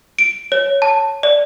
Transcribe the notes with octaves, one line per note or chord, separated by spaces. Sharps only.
D7
C#5
A5
D5